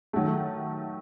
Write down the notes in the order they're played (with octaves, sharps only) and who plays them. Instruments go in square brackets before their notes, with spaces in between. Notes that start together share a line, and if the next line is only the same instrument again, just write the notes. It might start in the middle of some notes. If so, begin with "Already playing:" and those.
[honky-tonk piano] D#3 F#3 A3